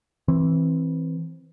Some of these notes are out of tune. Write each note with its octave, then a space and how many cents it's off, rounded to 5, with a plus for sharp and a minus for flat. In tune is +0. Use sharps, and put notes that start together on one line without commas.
E3 -15 C4 +10